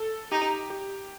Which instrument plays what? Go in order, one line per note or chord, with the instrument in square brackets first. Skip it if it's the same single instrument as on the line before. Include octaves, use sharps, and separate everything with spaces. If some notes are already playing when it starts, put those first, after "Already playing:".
Already playing: [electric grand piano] A4
[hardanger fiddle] D#4 [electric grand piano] G4
[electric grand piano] G4